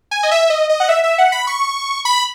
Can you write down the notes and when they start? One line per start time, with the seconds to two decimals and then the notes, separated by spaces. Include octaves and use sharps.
0.11 G#5
0.23 D#5
0.31 E5
0.50 D#5
0.69 D#5
0.80 F#5
0.89 E5
1.04 E5
1.18 F#5
1.32 B5
1.47 C#6
2.05 B5